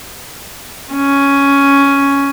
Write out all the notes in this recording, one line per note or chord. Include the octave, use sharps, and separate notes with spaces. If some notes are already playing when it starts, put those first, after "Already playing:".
C#4